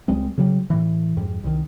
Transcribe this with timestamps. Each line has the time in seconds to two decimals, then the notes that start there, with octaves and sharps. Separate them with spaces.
0.08 C#2 G3 G#3 C4
0.38 C#3 F#3 G3
0.70 A2 E3
1.17 F2 G#2 G3
1.44 C2 D#3